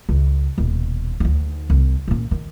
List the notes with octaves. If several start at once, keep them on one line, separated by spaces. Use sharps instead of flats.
C#2
D#1 B2
D2 D#4
C2
A#2 C#4
D#3